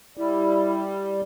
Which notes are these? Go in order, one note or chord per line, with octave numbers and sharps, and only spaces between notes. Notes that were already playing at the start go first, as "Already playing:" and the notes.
G3 E4